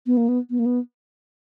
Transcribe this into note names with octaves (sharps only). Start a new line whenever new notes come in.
B3
A#3
B3
B3
A#3
B3